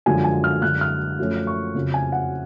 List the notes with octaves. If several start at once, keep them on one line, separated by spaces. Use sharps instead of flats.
F#2 D3 F3 G#3 G#5
G#5
F6
F#2 D3 G#3 F#6
F6
F#2 F3 A3 C#4
C#6
F2 C#3 F#3
G#5
F#5